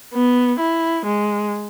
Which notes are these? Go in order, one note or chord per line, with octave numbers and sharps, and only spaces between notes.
B3
E4
G#3